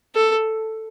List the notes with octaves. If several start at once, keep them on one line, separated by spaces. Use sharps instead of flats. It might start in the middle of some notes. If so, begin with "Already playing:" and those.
A4